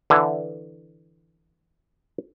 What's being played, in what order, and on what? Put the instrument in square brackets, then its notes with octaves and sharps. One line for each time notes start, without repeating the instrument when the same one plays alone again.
[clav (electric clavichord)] D3 E3